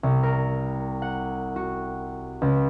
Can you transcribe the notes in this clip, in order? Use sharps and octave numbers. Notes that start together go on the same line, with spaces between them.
C2
A#4
F#5
F#4
C#2